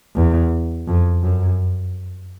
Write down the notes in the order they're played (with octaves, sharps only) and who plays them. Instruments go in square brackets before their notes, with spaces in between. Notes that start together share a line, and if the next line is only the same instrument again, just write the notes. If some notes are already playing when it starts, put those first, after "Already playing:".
[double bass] E2
F2
F#2